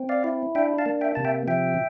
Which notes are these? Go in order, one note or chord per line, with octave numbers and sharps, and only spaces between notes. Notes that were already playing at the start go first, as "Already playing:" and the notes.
Already playing: C4
D5 F5
E4
D4 E5 G5
F5 A5
A#3
E5 G5
C3 A5
E5 G5
F3 E5 G5